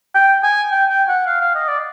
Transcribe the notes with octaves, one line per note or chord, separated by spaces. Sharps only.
G5
G#5
G5
G5
F#5
F5
F5
D#5
D5